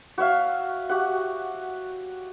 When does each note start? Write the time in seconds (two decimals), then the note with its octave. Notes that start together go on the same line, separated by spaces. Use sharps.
0.18 F#4 C#5 E5 F5
0.89 F#4 G4 F#5